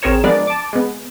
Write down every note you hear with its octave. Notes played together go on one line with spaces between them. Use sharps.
A1 C4 G#4 A#4 C#5 E7
F3 G#3 B3 D4 A#4 D5
A5 D6
G#3 B3